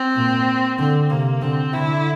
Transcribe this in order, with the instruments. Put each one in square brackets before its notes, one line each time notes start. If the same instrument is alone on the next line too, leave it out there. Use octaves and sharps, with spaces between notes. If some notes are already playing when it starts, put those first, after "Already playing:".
Already playing: [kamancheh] C4
[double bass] A#2
[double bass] D3 [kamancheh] C4
[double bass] C3 [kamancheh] A#3
[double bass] D3 [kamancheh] C4
[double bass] D3 [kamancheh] E4